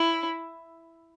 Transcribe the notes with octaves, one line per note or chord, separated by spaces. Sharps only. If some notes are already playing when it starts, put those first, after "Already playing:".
Already playing: E4